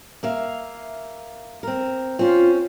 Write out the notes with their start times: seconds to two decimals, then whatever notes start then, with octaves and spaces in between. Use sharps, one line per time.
0.23 A#3 E5 F5
1.63 C4 A#4
2.19 C4 C#4 F4